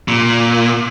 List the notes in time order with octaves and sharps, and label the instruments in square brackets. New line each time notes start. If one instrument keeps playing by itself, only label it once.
[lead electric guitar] A#2